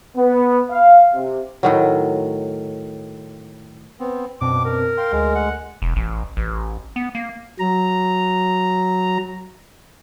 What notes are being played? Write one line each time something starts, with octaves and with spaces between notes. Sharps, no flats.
B3
F5
C3
A2 D#3 F#3
B3 C4
F#2 B2 C4 D4 D6
A#4
F5 G5 C6
D2 G#3
F#5
E1
A1
A1
B3
A#3
F#3 A#5